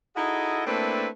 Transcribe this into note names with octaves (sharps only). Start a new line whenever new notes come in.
D#4 E4 F#4 G#4 A4 D#5
A3 A#3 C4 D4 E4 B4